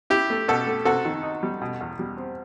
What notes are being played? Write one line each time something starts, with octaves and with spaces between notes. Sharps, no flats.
E4 G4
A3
B2 F#4 A4
A3
C3 F#4 A4
D#3
D#4
G3
B2
E2
G3
C4